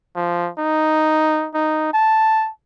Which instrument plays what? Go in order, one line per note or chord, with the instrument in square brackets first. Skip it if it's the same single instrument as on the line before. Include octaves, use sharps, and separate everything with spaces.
[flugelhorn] F3
D#4
D#4
A5